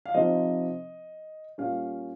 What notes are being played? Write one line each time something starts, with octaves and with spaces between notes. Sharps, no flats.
F5
C3 F3 C4 D#4 D#5
A#2 G3 C#4 F5